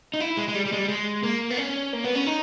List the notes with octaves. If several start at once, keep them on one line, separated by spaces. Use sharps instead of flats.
D#4
E4
G#3
G#3
G3
G3
G#3
G3
G#3
A#3
B3
C#4
A#3
B3
C#4
D#4